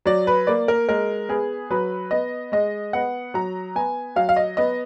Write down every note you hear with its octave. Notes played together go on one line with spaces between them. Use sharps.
F#3 D5
B4
A#3 D5
A#4
G#3 A#4
B3 G#4
F#3 B4
B3 D#5
G#3 D#5
B3 F#5
F#3 A#5
B3 G#5
F#3 F5
F5
D#5
B3 D#5